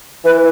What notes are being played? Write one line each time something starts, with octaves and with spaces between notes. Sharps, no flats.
E3 B4